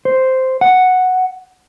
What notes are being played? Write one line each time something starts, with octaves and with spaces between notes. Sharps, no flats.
C5
F#5